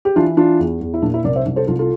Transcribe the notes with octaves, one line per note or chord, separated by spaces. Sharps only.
G4
E3 D4 F4
E3 D4 F4
E2
E2
E4
A#2 D4
E4
C2 A#4 D5
C5 E5
C2
A4 C5
C2 F4 A4
F4 A4